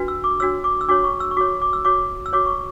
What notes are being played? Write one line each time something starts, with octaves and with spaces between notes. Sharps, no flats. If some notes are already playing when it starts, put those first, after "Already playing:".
Already playing: D4 F#4 B4
E6
D6
D4 F#4 C#5 E6
D6
E6
D4 F#4 C#5 D6
C#6
E6
C#6
F#4 C#5 D6
D6
E6
F#4 C#5 D6
E6
F#4 C#5 D6
C#6